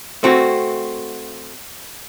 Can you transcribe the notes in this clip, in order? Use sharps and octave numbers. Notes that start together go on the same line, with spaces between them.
A3 C4 F#4